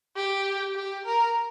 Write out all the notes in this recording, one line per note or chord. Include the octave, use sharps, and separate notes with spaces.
G4
G4
A#4